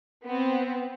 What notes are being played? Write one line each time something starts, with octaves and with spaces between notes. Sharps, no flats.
B3 C4